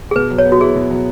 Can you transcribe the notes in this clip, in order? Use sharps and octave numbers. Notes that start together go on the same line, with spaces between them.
G#4
B2 B4
F#3
C#5
B3
F#4
E4 G#4
B2
F#3